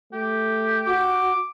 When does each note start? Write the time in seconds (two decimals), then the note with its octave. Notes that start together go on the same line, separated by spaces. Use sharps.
0.13 A3 G4
0.86 F#4 D6